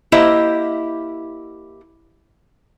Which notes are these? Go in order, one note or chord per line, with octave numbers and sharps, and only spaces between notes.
A#3 E4 G4 C5 D#5 E5